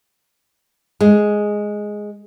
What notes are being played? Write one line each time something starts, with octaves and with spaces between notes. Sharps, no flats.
G#3